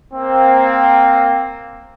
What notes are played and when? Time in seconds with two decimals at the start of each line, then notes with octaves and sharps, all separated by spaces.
0.14 A#3 C4